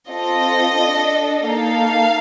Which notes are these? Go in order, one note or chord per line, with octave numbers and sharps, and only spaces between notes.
C4 F4 A4 D#5
D4 A4
A#3 D#4 A4 F5